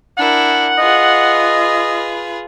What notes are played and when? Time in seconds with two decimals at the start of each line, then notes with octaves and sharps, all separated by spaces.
0.18 D4 E4 A#4 F#5
0.78 F4 G#4 B4 D#5